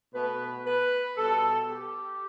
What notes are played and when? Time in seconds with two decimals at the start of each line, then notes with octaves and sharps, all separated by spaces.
0.13 B2 A3 B4
0.66 B4
1.17 B2 G3 A4
1.69 G4